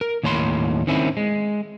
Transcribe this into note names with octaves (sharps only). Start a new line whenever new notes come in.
A#4
D#2 A2 C#5 B5 C6
D#3 C4 C#4 E4
G#3